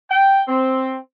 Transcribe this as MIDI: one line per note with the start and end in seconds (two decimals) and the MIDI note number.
0.10 0.41 79
0.48 0.95 60